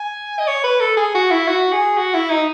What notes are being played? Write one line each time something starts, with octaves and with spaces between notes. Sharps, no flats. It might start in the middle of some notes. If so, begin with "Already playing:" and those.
Already playing: G#5
D#5
C#5
B4
A4
G#4
F#4
E4
F#4
G#4
F#4
E4
D#4